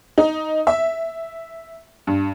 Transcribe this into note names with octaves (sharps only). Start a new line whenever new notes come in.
D#4
E5
G2